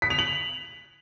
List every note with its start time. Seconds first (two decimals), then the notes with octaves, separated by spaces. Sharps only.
0.02 B6
0.10 F7
0.19 F#7